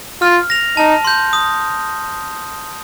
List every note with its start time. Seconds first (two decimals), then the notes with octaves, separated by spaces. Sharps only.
0.21 F4 F6
0.50 A#6 F7
0.77 D#4 A5
1.05 C6 G6
1.33 D#6